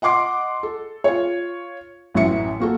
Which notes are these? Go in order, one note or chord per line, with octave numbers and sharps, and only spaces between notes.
D#5 F#5 C6 D6 C7
A4
F4 C#5
A1 F#2 F#4 E5 C#7
A#3 F#4 A4